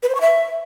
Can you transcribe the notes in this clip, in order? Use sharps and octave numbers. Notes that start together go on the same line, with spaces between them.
B4
C5
C#6
E5